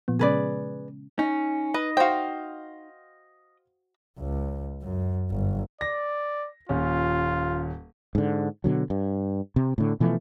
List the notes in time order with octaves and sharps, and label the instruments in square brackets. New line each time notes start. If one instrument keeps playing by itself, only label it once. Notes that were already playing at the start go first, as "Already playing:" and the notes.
[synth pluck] A#2 F3 B3
[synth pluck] C#3 G#3 C#4 [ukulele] G#4 B4 D5
[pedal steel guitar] C#4 [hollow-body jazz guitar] D#4
[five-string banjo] B4 [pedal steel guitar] D#5
[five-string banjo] F#4 G5 [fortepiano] C5 F5
[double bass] C#2
F#2
G1
[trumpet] D5 [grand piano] A#6
[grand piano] D#1 C#4 [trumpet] F4
[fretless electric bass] G#2 D3
B2 D3 F#3
G2
C3
A2 D3
B2 E3 F3 A3